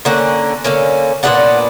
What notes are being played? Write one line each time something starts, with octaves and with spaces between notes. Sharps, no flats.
D3 A#3 C#4 F#5
D3 A#3 C#4
A#2 F#3 B3 D4 F#5